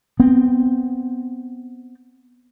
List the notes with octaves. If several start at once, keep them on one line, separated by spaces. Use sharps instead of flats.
B3 C4